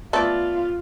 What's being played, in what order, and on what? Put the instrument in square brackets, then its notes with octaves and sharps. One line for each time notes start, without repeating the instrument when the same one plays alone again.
[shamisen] A3 A4 [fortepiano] B3 D5 [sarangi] F4